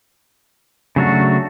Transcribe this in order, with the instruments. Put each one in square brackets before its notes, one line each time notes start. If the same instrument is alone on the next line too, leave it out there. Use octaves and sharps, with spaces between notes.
[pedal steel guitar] C#3 F#3 A3 D4 F#4